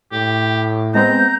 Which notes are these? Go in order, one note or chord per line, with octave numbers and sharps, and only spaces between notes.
A2 G4
G#3 B3 C4 A#5 G6